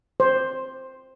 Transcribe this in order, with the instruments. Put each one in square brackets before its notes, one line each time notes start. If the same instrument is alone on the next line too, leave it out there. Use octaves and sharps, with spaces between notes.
[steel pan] C5